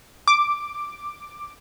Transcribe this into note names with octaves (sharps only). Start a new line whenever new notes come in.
D6